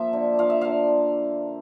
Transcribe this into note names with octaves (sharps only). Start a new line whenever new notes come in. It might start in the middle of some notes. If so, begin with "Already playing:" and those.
Already playing: F3 A#3 E5
D3
F3 F5
E5
D3 F5